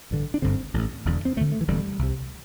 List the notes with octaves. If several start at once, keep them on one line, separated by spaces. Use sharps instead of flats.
A1 G2 D3
D4
G1 G2 D3 C4
A1 A2
E1 E2 D3
C4
D2 D3 A3
A3
E3
E1 E2 D3 G3
C2 C3